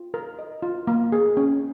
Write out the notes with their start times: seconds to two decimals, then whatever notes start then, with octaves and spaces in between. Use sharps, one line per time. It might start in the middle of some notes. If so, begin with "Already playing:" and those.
Already playing: F4
0.14 A#4
0.39 D#5
0.62 F4
0.87 A#3
1.12 G#4
1.37 C#4